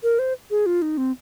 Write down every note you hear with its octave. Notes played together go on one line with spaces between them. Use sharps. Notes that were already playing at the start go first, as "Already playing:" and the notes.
A#4
C5
G#4
F4
D#4
C4